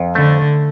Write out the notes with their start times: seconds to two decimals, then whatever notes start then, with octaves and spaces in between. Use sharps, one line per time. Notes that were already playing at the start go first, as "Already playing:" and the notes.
Already playing: F2
0.15 D3 A3